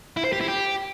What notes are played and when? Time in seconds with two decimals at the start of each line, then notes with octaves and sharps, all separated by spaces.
0.17 E4
0.25 C5
0.33 G4
0.41 E4
0.49 G4